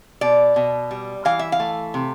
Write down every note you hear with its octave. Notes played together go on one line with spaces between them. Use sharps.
B2 D5
B2
G3
E3 F5
E5
F5
A3
C3